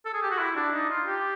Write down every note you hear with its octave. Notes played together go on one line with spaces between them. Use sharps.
A4
G#4
G4
F#4
E4
D4
D#4
F4
G4